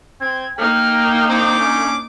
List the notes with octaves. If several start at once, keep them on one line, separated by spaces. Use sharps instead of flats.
C4 G#6
A#3 D#4 G5 F6
A#4
C4 D4 D6 G6
C#4